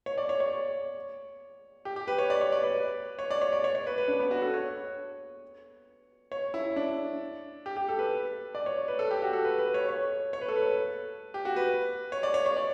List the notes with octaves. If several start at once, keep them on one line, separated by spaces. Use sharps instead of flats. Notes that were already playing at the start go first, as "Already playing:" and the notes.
C#5
D5
C#5
C#5
G4
G4
B4
C#5
D5
C#5
D5
B4
C#5
D5
C#5
D5
C#5
C#5
B4
B4
D4
B3
F#4
A4
C#5
C#5
E4
D4
G4
G4
A4
B4
D5
C#5
B4
A4
G4
F#4
A4
B4
B4
C#5
C#5
C#5
B4
A4
B4
G4
F#4
B4
C#5
D5
C#5
C#5
D5